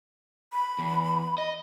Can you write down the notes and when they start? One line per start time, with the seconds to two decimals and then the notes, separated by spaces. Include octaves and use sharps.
0.52 B5
0.79 E2
1.38 D#5